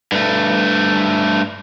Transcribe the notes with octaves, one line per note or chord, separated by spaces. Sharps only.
G2 A3